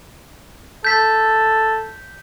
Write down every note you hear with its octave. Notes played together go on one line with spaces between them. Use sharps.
A4 G6 B6